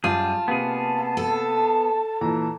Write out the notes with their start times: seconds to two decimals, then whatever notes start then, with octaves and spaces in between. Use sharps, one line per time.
0.04 F#2 G3 F4 G#4 A5
0.48 C3 A#3 B3 G#4
1.17 A4
2.21 A#2 E3 A#5